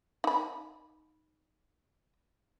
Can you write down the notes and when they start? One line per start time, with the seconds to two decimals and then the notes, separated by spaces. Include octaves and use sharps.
0.24 D#4 B5